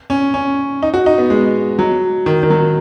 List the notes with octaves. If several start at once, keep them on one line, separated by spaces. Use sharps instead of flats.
C#4
C#4
D#4
F#4
D#4
B3
G#3
F#3
D#3
D#3
F#3